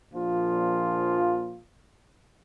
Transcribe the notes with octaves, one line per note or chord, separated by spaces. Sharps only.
A#1 A#2 F3 F4